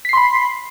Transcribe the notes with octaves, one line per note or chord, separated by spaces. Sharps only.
B5 C6 B6 C7